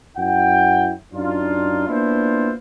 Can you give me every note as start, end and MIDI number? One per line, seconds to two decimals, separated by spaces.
0.17 0.92 42
0.17 0.92 64
0.17 0.92 78
0.17 0.92 79
1.13 1.85 42
1.13 1.85 62
1.13 1.85 63
1.13 1.85 65
1.88 2.52 58
1.88 2.52 59
1.88 2.52 62
1.88 2.52 64
1.88 2.52 65
1.88 2.52 72